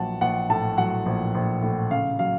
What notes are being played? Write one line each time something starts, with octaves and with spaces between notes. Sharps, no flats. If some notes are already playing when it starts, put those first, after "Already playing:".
Already playing: A#1 F#3 F#5 A5
A#1 F#5
A2 A5
F#3 F#5
A#1
A#1
A2
C#3 F5
F#3 F5